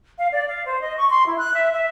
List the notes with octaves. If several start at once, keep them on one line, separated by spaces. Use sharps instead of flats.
F5
D5
F5
C5
D#5
C#6
C6
E4
F#6
E5
E5